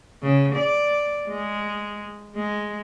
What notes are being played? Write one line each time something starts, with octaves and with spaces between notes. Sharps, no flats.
C#3
D5
G#3
G#3